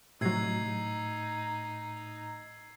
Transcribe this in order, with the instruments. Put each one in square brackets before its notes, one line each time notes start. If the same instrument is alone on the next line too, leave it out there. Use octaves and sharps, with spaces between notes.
[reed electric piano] A2 [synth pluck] C3 F#3 [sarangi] D#4 [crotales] E6 G#6 C7